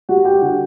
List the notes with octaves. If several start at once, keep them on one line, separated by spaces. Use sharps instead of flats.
G3 F#4 F#5
G4 G5
D3 F#4 F#5